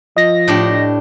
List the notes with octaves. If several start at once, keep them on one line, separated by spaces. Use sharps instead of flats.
F3 D#5 A#6
A2 D4 G4